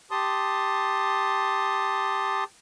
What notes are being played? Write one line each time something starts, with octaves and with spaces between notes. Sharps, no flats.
G4 A5 C6 D#6